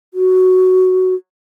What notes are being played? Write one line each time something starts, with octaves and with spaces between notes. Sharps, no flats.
F#4